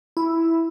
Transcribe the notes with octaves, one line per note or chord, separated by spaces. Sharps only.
E4